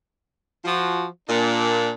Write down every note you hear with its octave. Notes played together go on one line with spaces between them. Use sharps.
F3 F#4
A#2 D4